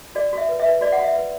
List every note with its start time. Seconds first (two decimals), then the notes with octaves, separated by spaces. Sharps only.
0.15 F#4 D5
0.33 F#4 E5
0.49 B4
0.60 E5
0.66 B4
0.81 F#4 D5
0.92 F#5
0.99 F#4
1.04 E5
1.15 B4